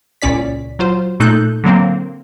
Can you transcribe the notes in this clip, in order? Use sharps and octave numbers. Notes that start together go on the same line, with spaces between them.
C#2 A#2 C#4 D5 B6
F#3 F4 C5
A#2 A3 D#4 A4 F#6 G6
D3 F#3 A#3 C4